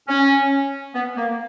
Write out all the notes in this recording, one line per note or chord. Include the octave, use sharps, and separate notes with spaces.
C#4
B3
A#3